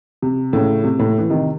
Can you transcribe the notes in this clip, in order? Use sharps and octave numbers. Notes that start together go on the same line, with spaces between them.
C3
A2 C#3
C3
A2
E3
C3 D#3